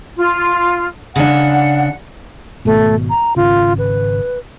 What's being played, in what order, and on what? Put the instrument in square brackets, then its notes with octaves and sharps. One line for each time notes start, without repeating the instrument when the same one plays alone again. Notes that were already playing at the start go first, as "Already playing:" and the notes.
[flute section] F4
[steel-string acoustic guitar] C#3 D4 [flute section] F#5
[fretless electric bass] G#1 B2 [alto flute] A3
[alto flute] A#5
[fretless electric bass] G#1 C#3 [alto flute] F4
[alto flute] B4